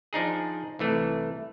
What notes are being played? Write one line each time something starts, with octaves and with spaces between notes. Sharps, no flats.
F3 D4 D#4 G#4
C2 E3 A3